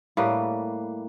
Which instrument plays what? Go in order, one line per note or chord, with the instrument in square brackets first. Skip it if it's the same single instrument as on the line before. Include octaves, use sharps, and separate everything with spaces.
[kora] A2 G3 A#3 B4